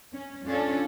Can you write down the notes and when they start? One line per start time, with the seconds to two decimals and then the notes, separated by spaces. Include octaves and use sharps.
0.13 C#4
0.45 C#4 D4 F4 A4